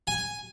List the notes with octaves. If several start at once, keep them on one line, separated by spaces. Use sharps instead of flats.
G#5